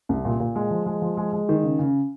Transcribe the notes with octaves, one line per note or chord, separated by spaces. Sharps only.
C2
A#2
A#2
G#3
F3
G#3
F3
G#3
G#3
D#3
C#3
C#3